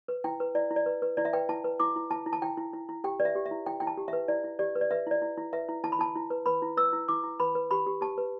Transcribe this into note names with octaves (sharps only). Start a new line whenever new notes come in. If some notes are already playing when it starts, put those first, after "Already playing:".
B4
E4 G5
B4
E4 D5
E4
D5
B4
B4
E4 D5
E5
B4 G5
E4 A5
B4
E4 D6
E4
E4 A5
E4
A5
E4 G5
E4
E4
E4
G4 G5
B4 D5
E5
G4
E5
E4
E4 G5
E4 G5
A5
G4
E5
B4
E4 D5
E4
G4 D5
B4
D5
B4 E5
E4 D5
E4
E4
B4 E5
E4
E4 A5
B5
E4 A5
E4
B4
B4 B5
E4
B4 E6
E4
E4 D6
E4
B4 B5
B4
G4 B5
G4
G4 A5
B4